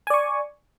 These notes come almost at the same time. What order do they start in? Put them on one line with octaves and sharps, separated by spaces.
G#5 D5 C#6